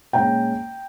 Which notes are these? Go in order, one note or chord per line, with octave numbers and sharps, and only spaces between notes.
A#2 G#3 C#4 G5 A#5